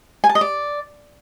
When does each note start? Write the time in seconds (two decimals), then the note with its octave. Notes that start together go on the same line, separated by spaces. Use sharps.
0.24 G#5
0.29 A5
0.35 D#5
0.41 D5